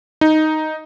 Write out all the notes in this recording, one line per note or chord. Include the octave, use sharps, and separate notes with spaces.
D#4